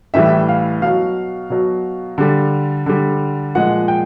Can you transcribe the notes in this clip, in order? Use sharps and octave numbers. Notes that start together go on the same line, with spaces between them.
A2 E3 G3 E5
F5
B2 F#3 F5
B2 F#3
D3 G3
D3 G3
A#2 F3 G#3 F#5
G5